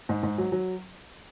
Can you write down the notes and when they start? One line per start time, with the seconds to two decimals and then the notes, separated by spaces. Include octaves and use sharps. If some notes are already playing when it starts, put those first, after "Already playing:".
0.09 G#2
0.23 G#2
0.38 F#3
0.52 F#3